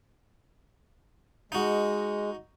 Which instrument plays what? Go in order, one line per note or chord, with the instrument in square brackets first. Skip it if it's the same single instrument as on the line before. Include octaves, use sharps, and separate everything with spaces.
[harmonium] G#3 [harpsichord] D#4 F#4